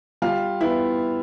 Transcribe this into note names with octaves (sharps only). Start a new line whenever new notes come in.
G3 F4 F5
B3 E4 E5